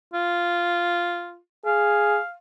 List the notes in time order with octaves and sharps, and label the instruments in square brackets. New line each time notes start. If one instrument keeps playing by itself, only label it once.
[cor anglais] F4
[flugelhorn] G#4 [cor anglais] F5